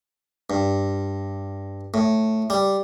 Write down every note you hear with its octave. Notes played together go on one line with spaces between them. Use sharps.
G2
A2
G3